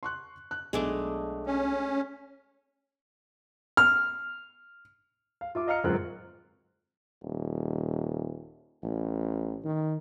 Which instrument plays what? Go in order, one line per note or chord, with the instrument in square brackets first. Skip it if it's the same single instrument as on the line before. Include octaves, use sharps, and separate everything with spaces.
[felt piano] C6 C#6 F#6
F#6
[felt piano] B1 [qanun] G#3 A3 D4
[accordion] C#4
[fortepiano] F6
[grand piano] F5
F4 E5 D6
D#5 F5 A#5 F6 C#7
D1 F#2 G#3 C4 F4 F#6
[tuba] D#1
A1
D#3